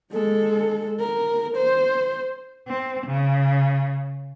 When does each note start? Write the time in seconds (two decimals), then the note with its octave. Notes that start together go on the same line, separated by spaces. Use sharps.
0.13 G#3 A4
0.99 A#4
1.57 C5
2.68 C4
3.07 C#3